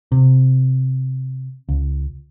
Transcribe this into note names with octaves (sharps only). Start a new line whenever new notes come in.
C3
C#2